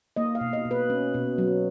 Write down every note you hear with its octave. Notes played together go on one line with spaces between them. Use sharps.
A#3 D#5
F5
B2
D#5
B2
B4
C#4
B2
F#3